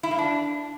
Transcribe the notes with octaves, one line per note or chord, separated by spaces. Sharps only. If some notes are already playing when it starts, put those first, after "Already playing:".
E4
A#3
D4